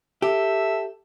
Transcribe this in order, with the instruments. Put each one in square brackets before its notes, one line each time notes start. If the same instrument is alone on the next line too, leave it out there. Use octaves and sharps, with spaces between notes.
[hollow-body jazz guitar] G4 [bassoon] A4 [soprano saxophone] E5